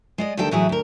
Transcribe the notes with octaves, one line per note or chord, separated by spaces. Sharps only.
G#3 D5 D#5
D2 D#3 G3 A4 G5
A2 E3 F#3 E4 G#4
D2 A#4